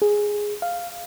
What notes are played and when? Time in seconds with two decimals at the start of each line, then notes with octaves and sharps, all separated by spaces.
0.02 G#4
0.62 F5